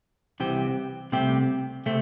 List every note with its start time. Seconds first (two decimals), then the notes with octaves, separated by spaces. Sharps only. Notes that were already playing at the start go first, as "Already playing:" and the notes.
0.40 C2 C3 E3 C4 G4
1.12 C2 C3 A3 C4 G4
1.86 C3 A3 C4